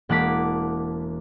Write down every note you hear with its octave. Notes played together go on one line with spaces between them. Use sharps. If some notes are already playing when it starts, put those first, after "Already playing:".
E1 A#3 F#5 A5 D6 B6